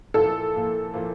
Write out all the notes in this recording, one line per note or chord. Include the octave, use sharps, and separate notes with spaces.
A#2 F3 A#3 E4 A4
A#2 F3 A#3 E4
A#2 F3 A#3 E4